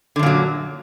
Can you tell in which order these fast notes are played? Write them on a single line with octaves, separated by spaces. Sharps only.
D3 F#2 A#2 F#3